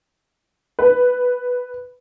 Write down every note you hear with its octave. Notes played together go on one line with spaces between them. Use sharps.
B4